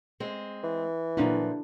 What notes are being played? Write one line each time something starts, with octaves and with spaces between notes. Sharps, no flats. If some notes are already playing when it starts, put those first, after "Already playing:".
G#3 C4
E3
A#2 F3 F#3 D4 E4